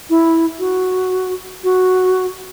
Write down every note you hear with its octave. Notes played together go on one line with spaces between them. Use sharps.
E4
F#4
F#4